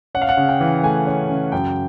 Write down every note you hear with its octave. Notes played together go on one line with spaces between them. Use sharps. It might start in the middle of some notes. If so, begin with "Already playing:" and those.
C#4 F#5
F5
F#5
C#3
G5
E3
A3 G#5
C#4
C#3
F#2 G5